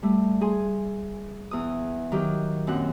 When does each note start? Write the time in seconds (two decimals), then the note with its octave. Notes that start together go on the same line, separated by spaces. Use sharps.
0.02 G3 A3
0.41 G#4 G#5 C6
1.51 E2 D#6
2.12 D#3 F#3 G4
2.67 F#2 A#2 C4 F#5